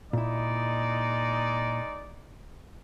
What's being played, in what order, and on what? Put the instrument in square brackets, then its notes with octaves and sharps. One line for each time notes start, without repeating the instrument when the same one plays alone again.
[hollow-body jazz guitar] A#2 E4 [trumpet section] G#3 D#4 D5